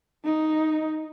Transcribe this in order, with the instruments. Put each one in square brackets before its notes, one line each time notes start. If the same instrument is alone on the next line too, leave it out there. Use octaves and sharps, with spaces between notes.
[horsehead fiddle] D#4